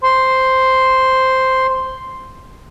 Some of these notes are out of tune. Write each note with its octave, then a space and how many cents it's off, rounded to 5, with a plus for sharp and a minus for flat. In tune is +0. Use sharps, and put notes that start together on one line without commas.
C5 +0 C6 +0